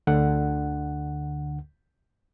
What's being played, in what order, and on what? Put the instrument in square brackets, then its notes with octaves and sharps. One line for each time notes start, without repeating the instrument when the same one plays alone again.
[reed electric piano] D2 D3 F#5